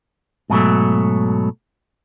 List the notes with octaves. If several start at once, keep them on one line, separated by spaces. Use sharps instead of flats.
G#2 B2 F#3 A3